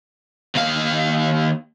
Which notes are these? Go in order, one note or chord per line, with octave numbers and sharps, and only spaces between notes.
D#2 F5